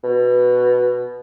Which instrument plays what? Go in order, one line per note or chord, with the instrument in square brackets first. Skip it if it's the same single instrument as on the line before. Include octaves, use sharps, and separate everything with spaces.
[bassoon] B2